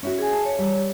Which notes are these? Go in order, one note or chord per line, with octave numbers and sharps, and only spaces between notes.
C#4 E4 F#4
G#4 G#5
A5
C#5
G3